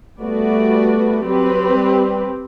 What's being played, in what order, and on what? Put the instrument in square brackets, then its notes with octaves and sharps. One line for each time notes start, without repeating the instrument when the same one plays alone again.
[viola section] G3 B3 F#4 B4 D5 [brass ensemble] A3
[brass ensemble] F#3 [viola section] C4 G4 B4
[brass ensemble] G3